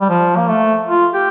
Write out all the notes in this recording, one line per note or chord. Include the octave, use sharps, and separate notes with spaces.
G3
F3
A#3
A3
F4
G4